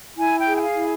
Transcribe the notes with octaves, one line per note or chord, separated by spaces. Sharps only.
E4 G#5
G5
G#4
G5
F5
E4